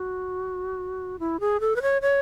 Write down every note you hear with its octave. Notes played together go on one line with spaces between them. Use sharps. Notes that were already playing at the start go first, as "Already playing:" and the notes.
Already playing: F#4
E4
G#4
A4
B4
C#5
C#5